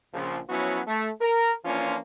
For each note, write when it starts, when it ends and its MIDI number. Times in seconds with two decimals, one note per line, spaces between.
0.14 0.39 34
0.14 0.39 49
0.14 0.39 53
0.49 0.81 53
0.49 0.81 54
0.49 0.81 59
0.49 0.81 61
0.49 0.81 64
0.49 0.81 66
0.88 1.09 57
1.21 1.53 70
1.65 1.97 52
1.65 1.97 53
1.65 1.97 58
1.65 1.97 61
1.65 1.97 62
1.65 1.97 65